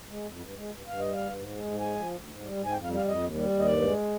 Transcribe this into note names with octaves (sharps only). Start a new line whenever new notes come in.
G#3
F2
G2
G#3
G2
G2 F5
G3 D#5
F5
G2
G#2
G#3
G#2
G#3 G#5
F3
D2
G#2
G3
G#2
G#5
F2 G5
F5
G3
F5
F2 D#5
D#2
G3
D#2
D#5
G2 D5
G#3